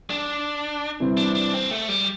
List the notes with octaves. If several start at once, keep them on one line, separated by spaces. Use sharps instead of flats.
D4
C3 E3 G3 C4
D4
D4
C4
A3
G3